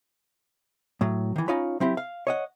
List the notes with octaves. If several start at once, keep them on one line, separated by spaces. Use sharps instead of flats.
A2 F#3
D#3 E3
C#4 D#4 F4 C#5 B5
F#3 C4 E4 G4
F5
C#5 D#5 F#5